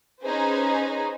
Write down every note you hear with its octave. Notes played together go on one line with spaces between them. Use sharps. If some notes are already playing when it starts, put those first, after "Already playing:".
C#4 D#4 G#4 B4 C5